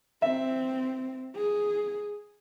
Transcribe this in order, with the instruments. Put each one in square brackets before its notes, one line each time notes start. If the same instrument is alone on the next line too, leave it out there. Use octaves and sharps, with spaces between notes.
[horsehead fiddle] C4 [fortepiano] E5
[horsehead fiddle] G#4